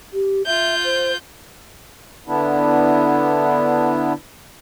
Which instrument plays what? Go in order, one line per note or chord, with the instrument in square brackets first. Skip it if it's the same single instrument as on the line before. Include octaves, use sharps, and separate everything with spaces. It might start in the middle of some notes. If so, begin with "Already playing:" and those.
[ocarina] G4
[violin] F4 G6 [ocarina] E5
[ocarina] C5
[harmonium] D3 B3 D4 E4